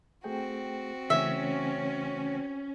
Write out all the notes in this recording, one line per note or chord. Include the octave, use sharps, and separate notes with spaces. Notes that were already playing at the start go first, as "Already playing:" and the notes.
A3 C4 F#4 G#4 G5
C#3 E3 A3 C#4 E5